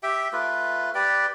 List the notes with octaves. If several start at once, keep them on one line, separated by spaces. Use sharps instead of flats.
G4 E5 G5
A3 F4 B4
G4 B4 D5 G5